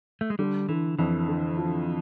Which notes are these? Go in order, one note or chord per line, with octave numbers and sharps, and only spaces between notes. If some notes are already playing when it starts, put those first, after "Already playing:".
A3
G#3
D3 G3
D3 E3
F2 E3
D3
F3